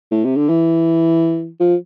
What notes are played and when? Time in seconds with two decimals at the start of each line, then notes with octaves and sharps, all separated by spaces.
0.12 A2
0.24 C3
0.36 D3
0.49 E3
1.60 F3